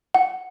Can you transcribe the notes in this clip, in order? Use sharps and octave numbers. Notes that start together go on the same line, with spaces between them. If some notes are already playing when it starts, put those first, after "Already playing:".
F#5